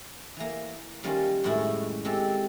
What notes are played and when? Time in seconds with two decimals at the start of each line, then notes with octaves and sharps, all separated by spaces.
0.36 E3 A#3
1.03 D#3 G3 A#3 C#4 F4 C5
1.44 F#2 A2 D#3 G#3 E4 F#4
2.05 G#3 C4 G4 A4